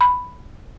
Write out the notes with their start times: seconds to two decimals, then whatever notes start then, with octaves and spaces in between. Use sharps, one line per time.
0.01 B5